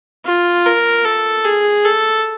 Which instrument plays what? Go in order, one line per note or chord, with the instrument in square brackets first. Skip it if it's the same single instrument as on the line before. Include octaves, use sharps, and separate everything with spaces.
[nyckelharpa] F4
A#4
A4
G#4
A4